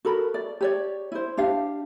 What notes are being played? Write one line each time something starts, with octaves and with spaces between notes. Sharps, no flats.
F#4 A4 A#4 B5
D5
G4 C#5 D5
E4 C5
D4 G4 F5